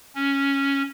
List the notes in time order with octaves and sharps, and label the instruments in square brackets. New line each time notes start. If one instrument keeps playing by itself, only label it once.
[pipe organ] C#4